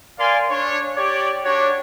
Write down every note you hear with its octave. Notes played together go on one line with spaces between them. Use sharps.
A#4 D5 F5 G#5 C6
D4 C#5
G4 C#5 D5
D4 F#4 G4 C#5